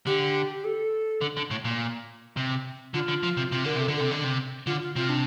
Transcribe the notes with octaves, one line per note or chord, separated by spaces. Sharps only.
D3 G4
A4
D3
D3
A2
A#2
C3
D3 F4
D3
F3
C3
C3 F4
D3 A#4
C3 A4
D3
A4
C3
D3
C3
D3 F4
F4
C3 F4
D4